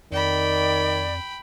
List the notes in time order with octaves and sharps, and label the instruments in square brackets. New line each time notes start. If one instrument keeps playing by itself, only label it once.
[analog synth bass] F2 [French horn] D#3 [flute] D5 [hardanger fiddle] G5 B5